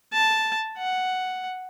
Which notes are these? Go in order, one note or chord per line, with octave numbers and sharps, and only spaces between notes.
A5
F#5